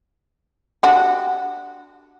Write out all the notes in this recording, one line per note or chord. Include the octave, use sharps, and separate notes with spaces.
D4 F#4 G4